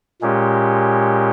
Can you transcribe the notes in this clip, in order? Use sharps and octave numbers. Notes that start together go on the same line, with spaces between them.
A#2 G#3 C#4 G4